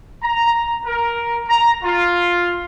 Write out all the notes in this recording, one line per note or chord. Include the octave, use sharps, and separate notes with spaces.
A#5
A#4
A#5
F4